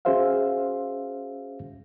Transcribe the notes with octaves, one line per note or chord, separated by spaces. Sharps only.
C#4 F#4 G#4 C5 E5 F5